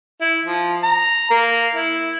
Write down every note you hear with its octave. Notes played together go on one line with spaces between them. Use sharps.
E4
F3
A#5
A#3
E4